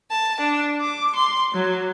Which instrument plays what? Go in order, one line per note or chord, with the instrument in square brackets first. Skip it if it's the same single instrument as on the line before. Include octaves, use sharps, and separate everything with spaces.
[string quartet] A5
D4
D6
C6
F#3